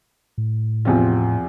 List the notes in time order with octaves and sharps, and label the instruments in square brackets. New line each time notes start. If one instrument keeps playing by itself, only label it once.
[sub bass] A2
[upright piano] E2 C3 F3 C4 F4